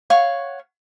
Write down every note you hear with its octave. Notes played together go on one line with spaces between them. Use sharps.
C#5 F5 F#5 C#6